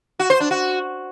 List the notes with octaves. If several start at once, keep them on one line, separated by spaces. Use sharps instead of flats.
F#4
C5
D4
F#4